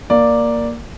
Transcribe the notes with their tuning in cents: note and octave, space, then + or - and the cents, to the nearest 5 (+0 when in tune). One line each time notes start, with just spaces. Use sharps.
A#3 +0 D5 +0